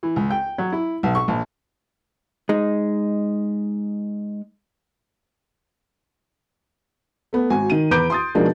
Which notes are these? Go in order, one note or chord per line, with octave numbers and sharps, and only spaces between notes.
E3
C#2
G5
F#3
E4
B1
C#6
A#1
G#3 D#4
A3 B3
G#1 F#4 G#5
D#3 D#7
E2 B4 A#5 D6 G6 D7
C6 D#6 A6
B2 F3 G#3 A#3 D4 D#4